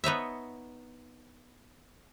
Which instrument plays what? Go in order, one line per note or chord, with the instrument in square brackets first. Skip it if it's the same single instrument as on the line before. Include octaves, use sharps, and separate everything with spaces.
[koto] B3 D#4 C#5 E5